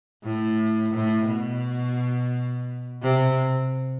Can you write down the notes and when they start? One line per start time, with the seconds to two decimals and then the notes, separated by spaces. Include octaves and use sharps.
0.23 A2
0.94 A2
1.28 B2
3.03 C3